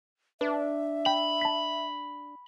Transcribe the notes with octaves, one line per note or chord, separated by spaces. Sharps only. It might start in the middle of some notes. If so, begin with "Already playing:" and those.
D4 B4 E5
G5 B5
A5 B6